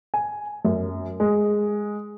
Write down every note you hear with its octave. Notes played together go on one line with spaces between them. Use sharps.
G#5
F#2
G#3